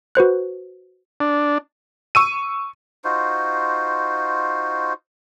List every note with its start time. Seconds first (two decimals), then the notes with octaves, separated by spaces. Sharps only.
0.15 F#4 B4 C5 F#6
1.20 D4
2.15 C#6 E6 D#7
3.04 D#4 F4 F#4 C5